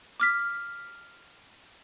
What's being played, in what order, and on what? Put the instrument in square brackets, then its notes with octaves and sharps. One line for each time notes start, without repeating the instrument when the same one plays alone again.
[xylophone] D6 F6 B6